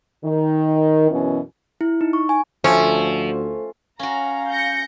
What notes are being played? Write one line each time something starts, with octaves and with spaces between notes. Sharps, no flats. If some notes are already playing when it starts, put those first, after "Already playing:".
D#3
F#2 B2 E3 C#4
E4
D#4
C#6
G#5
D2 F3 A3 C#4
C#4 F#4 F5 A#5
G6 A#6 C#7